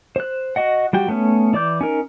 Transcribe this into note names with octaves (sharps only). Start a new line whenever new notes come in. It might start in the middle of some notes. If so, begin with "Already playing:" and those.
C5 F#6
F#4 D#5 F#5
G3 F#4 G5
A3 B3 C#4
E3 D5 D6 G6
C#4 D#4 A#4